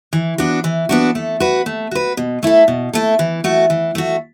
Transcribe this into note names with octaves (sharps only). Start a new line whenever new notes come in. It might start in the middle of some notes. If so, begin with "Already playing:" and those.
E3
B3 D4 F#4
E3
B3 D4 F#4
A3
F#4 B4
A3
F#4 B4
B2
A3 E4 A4
B2
A3 E4 A4
E3
A3 F#4
E3
A3 F#4